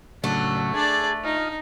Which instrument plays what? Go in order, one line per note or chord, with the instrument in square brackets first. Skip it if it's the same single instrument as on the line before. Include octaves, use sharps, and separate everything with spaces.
[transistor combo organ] A2 C#3 F#3 [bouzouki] A3 [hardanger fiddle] D4
[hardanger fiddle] D4 D5 [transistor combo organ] G#4
[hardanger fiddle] D#4 [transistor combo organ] F4 D#5